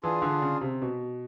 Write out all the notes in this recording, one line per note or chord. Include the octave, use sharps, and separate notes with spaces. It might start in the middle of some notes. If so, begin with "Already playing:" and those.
E3 D4 F4 G#4
D3
C#3
C3
B2